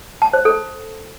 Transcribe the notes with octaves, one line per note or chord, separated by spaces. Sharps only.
A5
C5
A4